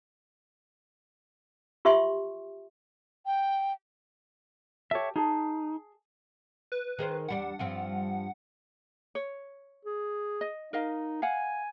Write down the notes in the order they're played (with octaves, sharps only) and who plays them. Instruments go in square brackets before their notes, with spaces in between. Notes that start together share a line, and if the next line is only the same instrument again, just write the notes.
[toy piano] F4 G4 E5 C6 C#6
[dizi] G5
[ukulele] G4 A4 [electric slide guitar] C#5 E5
[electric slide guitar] D#4 [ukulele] G#4 A5
[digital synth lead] B4
[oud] D#3 G#4 C5
[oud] E2 G3 D4 [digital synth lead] F#5
[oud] G2 F3 C4
[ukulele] C#5
[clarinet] G#4
[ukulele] D#5
[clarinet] D#4 [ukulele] A#4 D#5 F5
[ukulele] F5 F#5 [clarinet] G#5